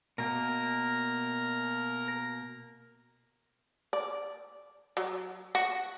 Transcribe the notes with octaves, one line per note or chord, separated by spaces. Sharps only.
B2 A#3 A#4
D5
F#3
F#4